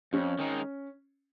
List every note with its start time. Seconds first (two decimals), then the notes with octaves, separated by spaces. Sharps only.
0.13 F2 C#4
0.39 D#3 G#3 D#4